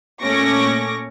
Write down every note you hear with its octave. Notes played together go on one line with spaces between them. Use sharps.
A#2 A3 C#4 C#6 D6 A#6